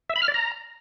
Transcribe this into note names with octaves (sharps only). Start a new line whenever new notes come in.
E5
B5
F6
D5
A#5